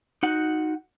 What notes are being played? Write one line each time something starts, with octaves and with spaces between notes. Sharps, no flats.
D#4 F#4 F#5